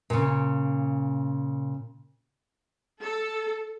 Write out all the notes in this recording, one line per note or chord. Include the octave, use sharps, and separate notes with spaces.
A#2 C#3
A4